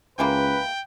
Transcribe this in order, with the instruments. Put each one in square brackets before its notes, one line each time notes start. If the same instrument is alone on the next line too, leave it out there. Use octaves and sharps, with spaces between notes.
[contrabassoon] C#2 [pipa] E3 G#3 A#3 [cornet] B4 [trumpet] G5